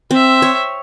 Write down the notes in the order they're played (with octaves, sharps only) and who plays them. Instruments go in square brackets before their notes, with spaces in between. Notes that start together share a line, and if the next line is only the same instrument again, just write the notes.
[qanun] C4 [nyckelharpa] C5 E5
[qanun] C#5